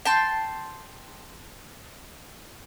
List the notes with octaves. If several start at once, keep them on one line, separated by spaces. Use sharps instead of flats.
G5 A5 C6